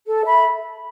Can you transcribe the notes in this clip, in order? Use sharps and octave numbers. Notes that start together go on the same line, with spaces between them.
A4
E5 B5